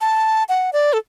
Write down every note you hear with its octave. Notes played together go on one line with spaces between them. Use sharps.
A5
F#5
D5
A4